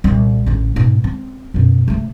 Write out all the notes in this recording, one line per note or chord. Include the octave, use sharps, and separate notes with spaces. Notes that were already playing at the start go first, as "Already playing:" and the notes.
C2 A#2
A1 D3
G#2 B2
C4
F#2 B2
C3 A3